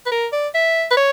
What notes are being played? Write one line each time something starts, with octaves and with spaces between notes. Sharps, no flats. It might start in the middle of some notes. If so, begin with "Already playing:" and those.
B4
A#4
D5
E5
B4
C#5